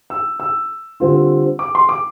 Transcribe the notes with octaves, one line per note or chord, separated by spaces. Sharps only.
E6
E6
D3 G3 C4 F4
D6
C6
D6